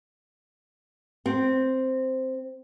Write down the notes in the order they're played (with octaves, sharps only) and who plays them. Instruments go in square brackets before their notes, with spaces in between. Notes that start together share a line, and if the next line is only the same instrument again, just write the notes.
[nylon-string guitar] C4